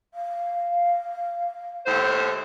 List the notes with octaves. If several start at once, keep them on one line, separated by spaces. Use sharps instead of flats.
F5
D#2 A2 C5